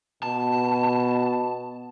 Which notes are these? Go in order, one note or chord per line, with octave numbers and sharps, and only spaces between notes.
B2 A5